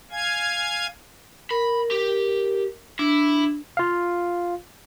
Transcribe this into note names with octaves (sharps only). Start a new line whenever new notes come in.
F5 G#5 G#6
A#4 B5
G4
D4 E4
F4 F5